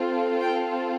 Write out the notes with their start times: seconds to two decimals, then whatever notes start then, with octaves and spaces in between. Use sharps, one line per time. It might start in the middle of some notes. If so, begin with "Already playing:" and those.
Already playing: C4 F4 A4
0.41 G5